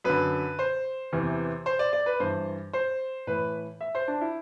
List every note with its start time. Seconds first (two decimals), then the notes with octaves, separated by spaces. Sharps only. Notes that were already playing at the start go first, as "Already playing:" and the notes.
0.04 F#2 D3 B4
0.59 C5
1.12 E2 C3 E3
1.66 C5
1.79 D5
1.93 D5
2.06 B4
2.19 G2 E3 C5
2.73 C5
3.27 A2 E3 B4
3.81 E5
3.95 C5
4.08 D4
4.21 E4